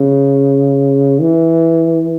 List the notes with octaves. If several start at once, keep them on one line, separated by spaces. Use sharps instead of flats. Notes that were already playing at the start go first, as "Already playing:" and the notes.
Already playing: C#3
E3